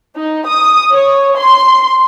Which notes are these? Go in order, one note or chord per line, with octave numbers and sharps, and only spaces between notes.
D#4
D#6
C#5
C6